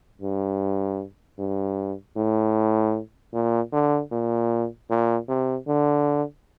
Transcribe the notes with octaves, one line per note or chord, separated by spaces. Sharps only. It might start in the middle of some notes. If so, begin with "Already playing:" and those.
G2
G2
A2
A#2
D3
A#2
A#2
C3
D3